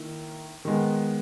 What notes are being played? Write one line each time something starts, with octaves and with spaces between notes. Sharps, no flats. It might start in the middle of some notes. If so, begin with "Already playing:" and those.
Already playing: D#3 A#3 E4
D#3 G#3 B3